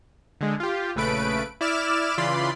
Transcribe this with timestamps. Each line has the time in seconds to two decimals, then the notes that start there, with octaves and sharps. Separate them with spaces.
0.41 D3 G#3
0.60 F4 G4
0.95 A#1 C#3 A3 B4 D7
1.61 E4 D5 D6 F6 E7
2.18 C#3 E3 F4 D5 B5 C6